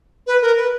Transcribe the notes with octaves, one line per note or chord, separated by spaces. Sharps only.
B4
A#4
B4